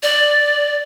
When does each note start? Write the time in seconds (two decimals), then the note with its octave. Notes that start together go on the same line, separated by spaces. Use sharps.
0.03 D5